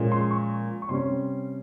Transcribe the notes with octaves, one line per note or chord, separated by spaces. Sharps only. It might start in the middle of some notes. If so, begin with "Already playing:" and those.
Already playing: A#2 F3 G#3 C#4
C6
C#6
C#6
C3 G3 C#4 C6